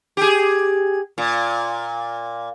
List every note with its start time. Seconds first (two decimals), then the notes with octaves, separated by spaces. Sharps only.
0.17 G4 G#4
1.18 A#2